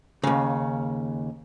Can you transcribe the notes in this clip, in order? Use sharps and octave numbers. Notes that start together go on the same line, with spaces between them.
D#2 C#3